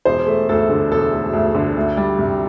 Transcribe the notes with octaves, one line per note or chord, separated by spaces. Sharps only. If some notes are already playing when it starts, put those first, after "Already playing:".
E1 C5
A3
D2 A4
D3
E1 A4
A3
D2
D3
D2
G3
C3